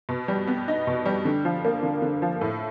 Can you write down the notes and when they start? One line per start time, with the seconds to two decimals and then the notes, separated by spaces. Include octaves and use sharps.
0.09 B2
0.28 G3
0.47 B3
0.68 D#4
0.87 B2
1.06 G3
1.25 D3
1.45 F3
1.65 A#3
1.83 D3
2.02 D3
2.22 F3
2.41 A2